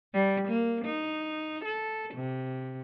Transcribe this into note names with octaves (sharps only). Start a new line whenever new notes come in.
G3
A#3
D#4
A4
C3